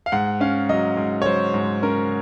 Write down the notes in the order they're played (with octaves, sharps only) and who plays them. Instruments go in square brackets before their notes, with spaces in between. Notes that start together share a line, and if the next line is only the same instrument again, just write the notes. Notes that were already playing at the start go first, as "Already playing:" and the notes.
[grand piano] F5
G#2 F#5
C#4 F5
F#3 D#5
G#2
C#5
F#3 C5
G#2
C#4 A#4